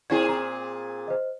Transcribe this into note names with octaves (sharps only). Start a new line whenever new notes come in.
A#2 C4 E4 G#4 G#6
A#5
C5 D#5